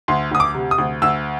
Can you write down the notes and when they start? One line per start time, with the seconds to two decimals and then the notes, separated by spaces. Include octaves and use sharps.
0.08 D2 C6
0.31 D2 D#6
0.40 D6
0.54 C3
0.71 D#6
0.78 D2
1.02 D2 E6